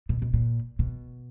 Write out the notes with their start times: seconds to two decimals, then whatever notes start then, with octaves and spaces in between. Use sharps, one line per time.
0.09 B2
0.22 B2
0.34 A#2
0.79 B2